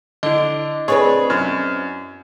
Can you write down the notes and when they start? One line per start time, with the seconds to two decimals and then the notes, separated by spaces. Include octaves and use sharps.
0.23 D3 E4 D#5
0.88 C4 D4 G#4 B4 C#5
1.30 F#2